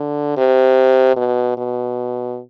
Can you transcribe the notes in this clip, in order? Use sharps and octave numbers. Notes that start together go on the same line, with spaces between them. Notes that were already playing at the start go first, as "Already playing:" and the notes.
Already playing: D3
C3
B2
B2